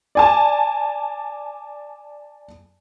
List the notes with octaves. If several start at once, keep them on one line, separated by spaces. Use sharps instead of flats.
D5 G#5 A5